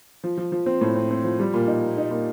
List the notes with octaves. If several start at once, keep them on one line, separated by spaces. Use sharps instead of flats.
F3
F3
F3
C4
A2
C4
C4
F3
G3
A#2
D#4
A#3
D#4
A#2